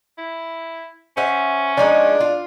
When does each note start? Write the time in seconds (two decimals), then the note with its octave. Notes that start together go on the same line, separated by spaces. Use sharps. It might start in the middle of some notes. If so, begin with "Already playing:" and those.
0.18 E4
1.17 C#4 C5 E5 F#5
1.78 F3 G#3 D4 D#4
2.20 F4